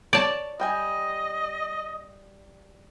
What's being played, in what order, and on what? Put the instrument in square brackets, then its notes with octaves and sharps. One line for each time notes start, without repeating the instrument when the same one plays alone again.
[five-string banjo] C#5 [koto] D5 A5
[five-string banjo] G3 G5 G#5 [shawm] D#5